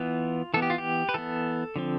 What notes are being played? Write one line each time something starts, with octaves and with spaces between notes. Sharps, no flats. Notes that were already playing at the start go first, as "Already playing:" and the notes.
Already playing: E3 B3 F4
E3 B3 A4
G4
F4
G4
B4
E3 B3 A4
D3 F3 C4